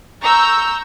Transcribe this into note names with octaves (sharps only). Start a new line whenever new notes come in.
A#5 C#6 E6 G6